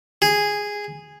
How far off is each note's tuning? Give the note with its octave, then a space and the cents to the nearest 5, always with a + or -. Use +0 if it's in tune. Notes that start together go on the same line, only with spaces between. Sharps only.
G#4 -10